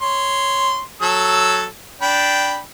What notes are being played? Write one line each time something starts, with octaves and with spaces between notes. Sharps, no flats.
C#5 C6
F#3 A4 E6
D4 G5 B5